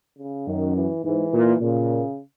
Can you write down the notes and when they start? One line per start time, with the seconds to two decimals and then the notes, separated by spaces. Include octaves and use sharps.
0.18 C#3
0.47 F#2 D#3
0.76 E3
1.04 G#2 E3
1.33 A#2
1.61 A#2 C#3